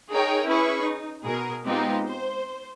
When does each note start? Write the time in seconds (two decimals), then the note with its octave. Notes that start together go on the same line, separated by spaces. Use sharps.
0.12 D#4 G#4 A#4 C#5 G5
0.47 C#4 E4 G#4 B4 B5 C#6
0.83 D#4
1.22 B2 G#4 A#4
1.64 G#3 B3 C4 D#4 F4 G4
2.08 C5